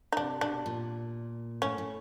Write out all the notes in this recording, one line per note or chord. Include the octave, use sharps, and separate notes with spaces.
D#4
C3 D4
B2 D4
A#2
A2 C#4
A2